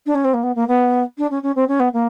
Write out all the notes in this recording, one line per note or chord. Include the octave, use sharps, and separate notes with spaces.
D4
C#4
C4
A#3
B3
A#3
B3
D4
C#4
C#4
C4
C#4
B3
A#3